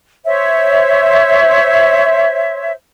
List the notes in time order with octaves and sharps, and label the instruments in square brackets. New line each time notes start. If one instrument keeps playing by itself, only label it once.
[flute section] C5 C#5 E5